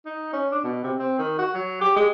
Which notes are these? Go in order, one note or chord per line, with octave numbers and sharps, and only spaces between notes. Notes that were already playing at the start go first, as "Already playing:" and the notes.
D#4
C#4
D4
B2
C3
C4
D#3
F#4
F#3
G4
G#3